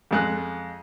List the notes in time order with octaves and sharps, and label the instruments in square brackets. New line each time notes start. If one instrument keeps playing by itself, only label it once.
[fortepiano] F2 G#3 F#6